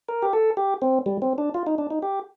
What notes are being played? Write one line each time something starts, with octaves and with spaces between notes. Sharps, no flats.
A#4
G4
A4
G4
C4
G3
C4
D4
F4
D#4
D4
D#4
G4